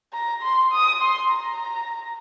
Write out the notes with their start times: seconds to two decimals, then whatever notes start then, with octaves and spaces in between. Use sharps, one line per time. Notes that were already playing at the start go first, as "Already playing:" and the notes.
0.13 A#5
0.43 C6
0.73 D#6
1.02 C6
1.32 A#5